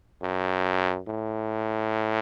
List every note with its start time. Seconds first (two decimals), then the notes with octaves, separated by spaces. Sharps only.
0.22 F#2
1.07 A2